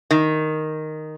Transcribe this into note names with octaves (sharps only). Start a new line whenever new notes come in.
D#3